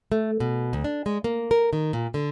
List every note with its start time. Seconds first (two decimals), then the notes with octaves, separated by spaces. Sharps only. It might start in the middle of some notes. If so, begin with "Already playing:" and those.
0.12 A3
0.40 B2
0.73 D2
0.84 D4
1.06 G#3
1.24 A#3
1.51 A#4
1.73 D#3
1.93 A#2
2.14 D3